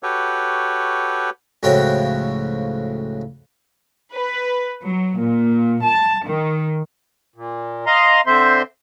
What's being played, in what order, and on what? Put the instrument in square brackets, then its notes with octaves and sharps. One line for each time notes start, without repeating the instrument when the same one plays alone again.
[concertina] F#4 G4 A4 B4 C#5
[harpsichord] C#2 A2 F3 F#4 C#5 G5
[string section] B4
F#3
A#2
A5
D#3
[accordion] A#2
D#5 F5 A#5 C6
D3 C4 C5 E5 C6